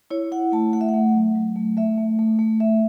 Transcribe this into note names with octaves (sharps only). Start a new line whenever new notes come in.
E4 C#5
E4 F#5
A3 A5
A3 F#5
E5
F#5
A3
F#3
F#3
A3
A3 E5
A3
A3
A3
A3 E5